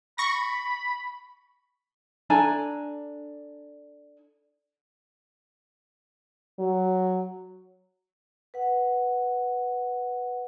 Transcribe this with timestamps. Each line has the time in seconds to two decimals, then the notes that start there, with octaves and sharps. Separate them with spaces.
0.18 B5 C#6 A#6
2.30 D4 A4 G#5 A#5
6.59 F#3
8.54 B4 F#5